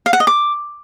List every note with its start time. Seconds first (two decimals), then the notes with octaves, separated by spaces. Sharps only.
0.06 F5
0.13 F#5
0.20 D#5
0.27 D6